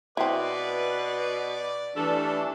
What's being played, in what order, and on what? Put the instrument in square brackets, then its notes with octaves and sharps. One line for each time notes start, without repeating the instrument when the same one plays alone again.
[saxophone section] B2 B4 [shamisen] C4 E4 [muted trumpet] D5
[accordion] E3 D4 [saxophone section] G3 A3 A4